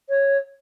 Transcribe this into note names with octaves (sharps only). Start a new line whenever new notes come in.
C#5